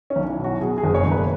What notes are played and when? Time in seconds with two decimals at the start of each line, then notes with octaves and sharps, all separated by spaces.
0.10 C#4
0.16 B1
0.27 E4
0.39 B2
0.44 F#4
0.61 B2 G#4
0.78 G#4
0.84 F#1
0.94 C#5
1.06 F#1
1.11 B4